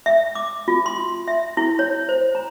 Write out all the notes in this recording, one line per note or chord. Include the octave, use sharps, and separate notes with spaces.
E5
D6
F4
C6
E5
E4
C#5
C5
A#5